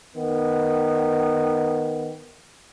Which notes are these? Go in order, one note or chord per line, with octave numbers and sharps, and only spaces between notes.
D#3 B3